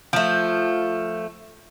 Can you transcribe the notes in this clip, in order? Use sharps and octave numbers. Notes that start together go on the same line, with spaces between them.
F3 A3